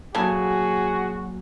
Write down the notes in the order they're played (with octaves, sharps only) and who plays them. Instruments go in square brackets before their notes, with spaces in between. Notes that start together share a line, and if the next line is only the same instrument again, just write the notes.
[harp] A#2 F#3 [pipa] C#3 A4 G#5 [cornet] F#4 [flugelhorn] G#4